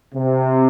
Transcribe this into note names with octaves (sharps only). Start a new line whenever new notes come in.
C3